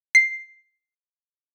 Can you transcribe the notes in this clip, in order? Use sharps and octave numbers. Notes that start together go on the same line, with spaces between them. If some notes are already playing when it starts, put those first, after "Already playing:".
C7